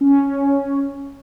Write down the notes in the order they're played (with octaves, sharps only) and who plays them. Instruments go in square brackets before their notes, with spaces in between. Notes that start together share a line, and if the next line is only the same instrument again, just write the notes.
[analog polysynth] C#4